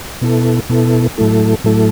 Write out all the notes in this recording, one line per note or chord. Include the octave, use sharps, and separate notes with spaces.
B2 B3 E4 A4
B2 B3 E4 A4
A2 F#3 A3 E4 A4
A2 F#3 A3 E4 A4